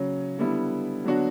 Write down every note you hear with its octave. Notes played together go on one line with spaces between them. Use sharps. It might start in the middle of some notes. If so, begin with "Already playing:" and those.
Already playing: C#3 F#3 C#4
D3 G3 B3 E4
D3 F#3 B3 D4 F#4